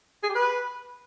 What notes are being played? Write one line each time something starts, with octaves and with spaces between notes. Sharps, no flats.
G#4
G4
B4